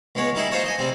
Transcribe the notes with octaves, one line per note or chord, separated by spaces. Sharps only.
C#2 G#3 B3 C#5
G3 D#4 E4 G#4
D#4 F4 C5 C#5 A5
D#5 G#5
C3 G3 C4